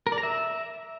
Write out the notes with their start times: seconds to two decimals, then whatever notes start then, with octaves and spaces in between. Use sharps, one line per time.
0.07 A#4
0.12 D5
0.18 A#5
0.23 E5